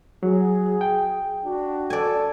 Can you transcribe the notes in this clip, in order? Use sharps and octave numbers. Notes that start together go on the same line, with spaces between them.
F#3 G#4
G5
D4 F#4
A4 D5 G#5